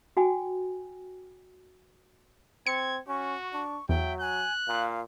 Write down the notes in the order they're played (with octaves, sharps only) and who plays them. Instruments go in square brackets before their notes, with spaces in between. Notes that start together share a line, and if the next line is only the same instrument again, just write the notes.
[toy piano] F#4 G5 G#5
[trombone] C4 [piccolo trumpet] G#6 [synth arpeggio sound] C#7
[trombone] C#4 [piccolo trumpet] F#4 [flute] C#6
[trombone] D4 [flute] C#6
[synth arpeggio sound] E2 [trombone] F#3 [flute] E5 [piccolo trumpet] G5
[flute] G#5 [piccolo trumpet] F#6
[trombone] A#2 [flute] F5